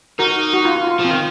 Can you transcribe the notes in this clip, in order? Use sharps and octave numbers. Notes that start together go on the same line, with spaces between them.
D#4 F#4 A#4
F#4
F4
F4
F4
F3
C4
D#3